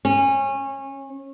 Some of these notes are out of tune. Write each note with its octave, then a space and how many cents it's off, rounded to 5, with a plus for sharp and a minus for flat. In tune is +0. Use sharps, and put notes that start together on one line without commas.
C#4 -25